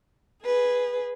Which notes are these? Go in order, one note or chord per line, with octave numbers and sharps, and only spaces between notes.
G#4 B4